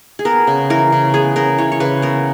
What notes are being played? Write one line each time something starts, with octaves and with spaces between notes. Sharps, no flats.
G#4
B3 A#4
C#3
E3 A#4
C#3
B3 G#4
C#3 A#4
E3 C#5
C#5
C#3 B4
B3 A#4